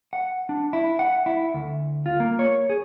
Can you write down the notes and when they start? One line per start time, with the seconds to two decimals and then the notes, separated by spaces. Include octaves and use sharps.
0.13 F#5
0.49 D4
0.73 E4
0.99 F#5
1.26 E4
1.54 D2
2.06 F4
2.20 A#3
2.39 C#5
2.69 G#4